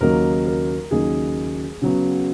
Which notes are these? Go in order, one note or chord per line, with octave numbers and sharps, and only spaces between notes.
D#2 C#3 F#3 A#3 D#4 A#4
A#4
D#2 C#3 F#3 A#3 D#4 G#4
C#3 F#3 B3